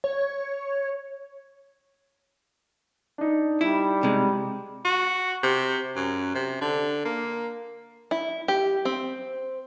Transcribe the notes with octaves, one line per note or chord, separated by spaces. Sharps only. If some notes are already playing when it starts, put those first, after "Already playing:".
C#5
D4 D#4
G3 E4
C3 G#3
F#4
C3
F#2
C3
D3
A#3
E4
G4
C4